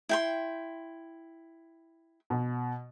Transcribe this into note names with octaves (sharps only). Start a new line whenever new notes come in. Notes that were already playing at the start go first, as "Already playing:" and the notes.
E4 G5 C6
B2